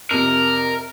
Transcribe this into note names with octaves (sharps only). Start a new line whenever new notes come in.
F2 C3 A#4